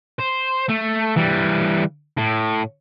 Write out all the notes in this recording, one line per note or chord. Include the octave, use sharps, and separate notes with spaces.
C5
A3
E3 G3
A2